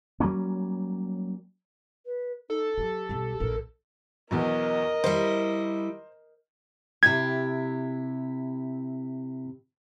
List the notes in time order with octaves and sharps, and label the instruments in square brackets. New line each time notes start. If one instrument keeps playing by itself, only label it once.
[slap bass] F#3 G3 A#3 C#4
[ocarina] B4
[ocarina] D#4 [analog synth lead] A4
[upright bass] F#3 [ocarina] G4
[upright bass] B1 G3
[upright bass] A#1 [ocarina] A#4
[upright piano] B1 E2 [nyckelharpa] A#4 D#5
[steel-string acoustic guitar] G3 E4 [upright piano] C5
[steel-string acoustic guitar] C3 E4 G4 [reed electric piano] G#6